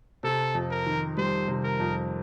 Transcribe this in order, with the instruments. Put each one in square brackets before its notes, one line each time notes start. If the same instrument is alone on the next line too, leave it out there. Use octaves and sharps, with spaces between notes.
[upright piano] C3 [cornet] A4
[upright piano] F2
[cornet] A#4
[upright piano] D#3
[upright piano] G3 [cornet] C5
[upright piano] C3
[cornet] A#4
[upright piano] F2